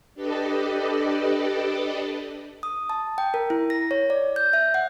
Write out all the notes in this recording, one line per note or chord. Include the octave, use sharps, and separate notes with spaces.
D4 G4 A4 B4 D5 D#5
D#6
A5
G5
A#4
E4
A#6
C#5
D5
G6
E5
F#5